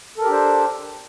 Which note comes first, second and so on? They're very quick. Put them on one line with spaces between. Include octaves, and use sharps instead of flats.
A4 A#4 G4 D4 C5